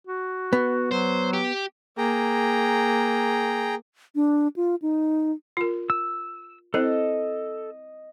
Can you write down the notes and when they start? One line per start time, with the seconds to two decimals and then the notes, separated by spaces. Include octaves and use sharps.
0.07 F#4
0.53 B3
0.91 F#3 C5
1.33 G4
1.98 A#3 G#4 G5 A#5
4.15 D4
4.56 F4
4.82 D#4
5.57 F4 A#4
5.90 E6
6.74 C4 E4 A4 C5 D#5